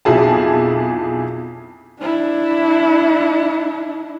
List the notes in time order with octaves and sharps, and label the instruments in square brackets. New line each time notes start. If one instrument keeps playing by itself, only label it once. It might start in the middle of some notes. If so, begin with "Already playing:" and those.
[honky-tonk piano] B1 F2 E4 G#4 A5
[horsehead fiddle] D4 E4